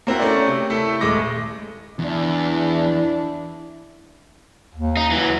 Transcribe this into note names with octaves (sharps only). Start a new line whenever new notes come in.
A#3 C4 E4 F#4
A3 C#4 A#4 D5
C3
A3 E4 A4
D#1 G#3 A3 D6 A#6
E2 D4 E4
D#2
D#4
E3 F#3